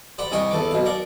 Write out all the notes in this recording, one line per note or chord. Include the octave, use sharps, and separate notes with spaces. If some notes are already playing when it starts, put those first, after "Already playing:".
C5 D5 F#5 G5 B5
C2 A#4 D#5 G5 G#5 C#6
E2 A4 B4 D6
B1 B2 F5
A#4 D5 F#5